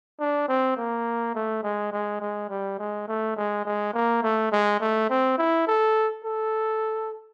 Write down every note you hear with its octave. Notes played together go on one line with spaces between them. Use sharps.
D4
C4
A#3
A3
G#3
G#3
G#3
G3
G#3
A3
G#3
G#3
A#3
A3
G#3
A3
C4
E4
A4
A4